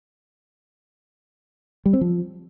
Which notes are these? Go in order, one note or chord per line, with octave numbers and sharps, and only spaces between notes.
G3
C4
F3